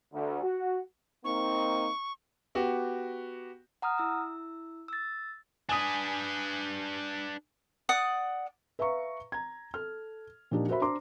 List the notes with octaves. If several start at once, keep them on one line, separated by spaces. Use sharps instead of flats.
D2
F#4
A#3 C4 D#4 C#6
B3 F#4 G4
F#5 A#5 D#6 F6
E4 E6
E6 A6
D4 B4 G#5 D#6
D5 F#5 D#6
B4 E5 F5 A#5 C#6
A#5 G#6
A4 F6
A#2 F3 D4 D#4 G4
F#4 A#4 C5 E5 B5
D4 C5 A#5 C6 D6